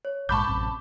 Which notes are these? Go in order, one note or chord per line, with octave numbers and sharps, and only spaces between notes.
C#5
A#1 G#2 G#3 A5 B5 C#6 D6 G6
A1 F#2 C3